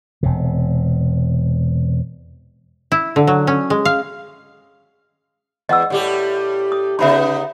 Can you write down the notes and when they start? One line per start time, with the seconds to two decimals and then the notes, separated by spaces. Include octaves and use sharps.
0.23 E1 C3
2.92 E4
3.16 D3
3.27 F#3
3.47 C#4
3.70 G#3
3.85 F5
5.69 E2 D#5 F#5 E6
5.90 A2 G3 G4
6.72 D#6
6.99 C#3 B3 D#4 E5 B5 C6